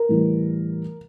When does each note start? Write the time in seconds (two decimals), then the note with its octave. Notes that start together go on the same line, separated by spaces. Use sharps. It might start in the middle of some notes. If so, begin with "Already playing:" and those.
Already playing: A#4
0.09 A2 E3 G3